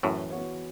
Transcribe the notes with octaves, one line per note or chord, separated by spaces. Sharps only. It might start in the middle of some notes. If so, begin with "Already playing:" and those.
F#2 A2 E3
B3 F#4 C#5